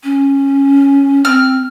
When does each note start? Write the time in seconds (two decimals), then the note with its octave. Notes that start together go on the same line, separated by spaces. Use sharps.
0.04 C#4
1.25 C4 F6